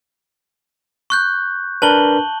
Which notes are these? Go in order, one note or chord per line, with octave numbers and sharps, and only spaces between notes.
C#6 F#6 G6
D4 A#4 B4 A5 F#7 G7